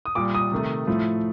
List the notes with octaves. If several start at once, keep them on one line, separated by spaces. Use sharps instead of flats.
D#6
A#2 G3 D6
D#6
C3 D#3 A3
A2 F3 A3